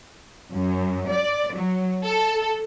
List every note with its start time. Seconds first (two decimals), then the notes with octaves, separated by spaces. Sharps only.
0.54 F#2
1.11 D5
1.57 F#3
2.05 A4